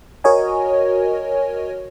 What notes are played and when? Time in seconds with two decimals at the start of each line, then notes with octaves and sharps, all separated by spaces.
0.24 F#4 A#4 C#5 D#5 G#5